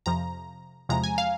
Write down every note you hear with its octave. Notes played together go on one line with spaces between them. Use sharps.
F2 C3 F3 A#5
E2 C3 F3 G#3 A#5
G#5
F5